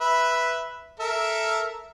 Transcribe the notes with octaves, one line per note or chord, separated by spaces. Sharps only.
B4 E5 B5
A4 A#4 E5